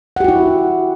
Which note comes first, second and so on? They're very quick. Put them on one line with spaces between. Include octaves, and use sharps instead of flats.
F#5 G4 F#4 E4